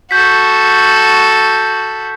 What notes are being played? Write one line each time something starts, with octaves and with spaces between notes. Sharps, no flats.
F#4 A4 G6 B6